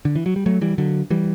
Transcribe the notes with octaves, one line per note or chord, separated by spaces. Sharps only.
D3
E3
F#3
G3
F#3 A3
E3 G3
D3 F#3
E3 G3